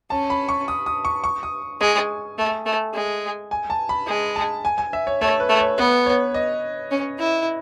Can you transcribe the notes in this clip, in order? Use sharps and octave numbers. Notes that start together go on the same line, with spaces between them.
C#4 A5
B5
C#6
D#6
D#6
C#6
C#6
D#6
G#3 G#5
A3
A3
G#3
G#5
A5
B5
G#3
A5
G#5
G#5
E5
C#5
A3 C#5
B4
A3
C#5
B3 B4
C#5
D#5
C#4
E4